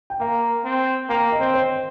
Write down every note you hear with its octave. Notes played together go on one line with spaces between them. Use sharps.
G5
A#3 F5
C4
A#3 G5
D#5
C4
C5